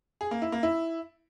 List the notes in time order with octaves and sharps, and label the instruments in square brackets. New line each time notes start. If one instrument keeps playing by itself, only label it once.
[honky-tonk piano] G#4
A#3
E4
A#3
E4